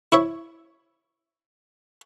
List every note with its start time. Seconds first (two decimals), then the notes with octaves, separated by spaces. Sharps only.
0.12 E4 C#5 E5